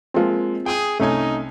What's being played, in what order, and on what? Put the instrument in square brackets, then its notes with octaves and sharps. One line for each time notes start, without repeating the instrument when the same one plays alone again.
[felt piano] F3 G#3 A#3 [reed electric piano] C4 F4
[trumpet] G#4 [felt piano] G5 D#6
[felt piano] C2 G#5 [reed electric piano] A3 C#4 [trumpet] D#4